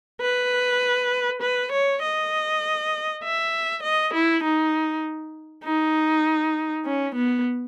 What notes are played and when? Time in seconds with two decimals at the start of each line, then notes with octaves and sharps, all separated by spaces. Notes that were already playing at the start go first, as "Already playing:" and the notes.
0.21 B4
1.42 B4
1.72 C#5
2.02 D#5
3.23 E5
3.83 D#5
4.14 E4
4.43 D#4
5.64 D#4
6.85 C#4
7.15 B3